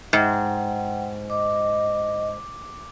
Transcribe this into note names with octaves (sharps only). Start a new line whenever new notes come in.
G#2 F#5 G5
D#5 D6